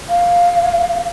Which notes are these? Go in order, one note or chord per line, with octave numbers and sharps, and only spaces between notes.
F5